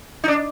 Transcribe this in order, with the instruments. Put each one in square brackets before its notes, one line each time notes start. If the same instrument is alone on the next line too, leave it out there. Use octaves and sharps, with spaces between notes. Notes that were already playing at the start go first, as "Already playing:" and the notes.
[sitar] D#4
D4